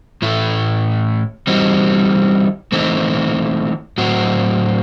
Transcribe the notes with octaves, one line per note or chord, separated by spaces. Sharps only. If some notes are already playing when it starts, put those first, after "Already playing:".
A2 E3 A3 E4
E3 G3 C4 D#4 F#4
E3 A3 C4 D#4
A2 F#3 C4 F#4